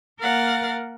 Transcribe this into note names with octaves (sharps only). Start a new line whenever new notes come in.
A#3 A#4 F5 F#5 A6